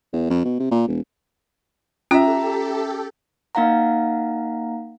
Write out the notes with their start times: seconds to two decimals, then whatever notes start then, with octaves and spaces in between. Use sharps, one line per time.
0.13 E2
0.30 F2
0.45 B2
0.60 C3
0.71 A#2
0.88 E1
2.11 C#4 F4 G4 A4 E5 A#5
3.55 A#3 D#4 F5 F#5 A#5